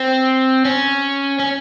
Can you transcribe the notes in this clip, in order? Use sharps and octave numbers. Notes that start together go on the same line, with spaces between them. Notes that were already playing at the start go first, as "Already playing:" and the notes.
Already playing: C4
C#4
C#4